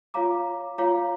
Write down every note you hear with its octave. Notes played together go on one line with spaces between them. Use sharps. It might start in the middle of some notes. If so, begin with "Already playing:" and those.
F4 C#5 F5 A#5 D6
F4 C#5 F5 A#5 D6